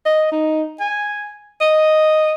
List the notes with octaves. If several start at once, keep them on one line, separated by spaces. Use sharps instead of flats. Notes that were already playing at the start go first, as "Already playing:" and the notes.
D#5
D#4
G#5
D#5